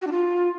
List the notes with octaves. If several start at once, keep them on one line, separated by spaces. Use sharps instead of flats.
F#4
D4
F4